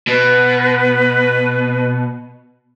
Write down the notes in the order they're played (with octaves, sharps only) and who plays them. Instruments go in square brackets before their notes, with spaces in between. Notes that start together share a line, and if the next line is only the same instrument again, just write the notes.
[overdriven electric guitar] B2 [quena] B4